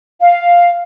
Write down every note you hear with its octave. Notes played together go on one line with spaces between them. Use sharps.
F5